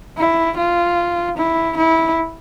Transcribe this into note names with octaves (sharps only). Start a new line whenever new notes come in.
E4
F4
E4
E4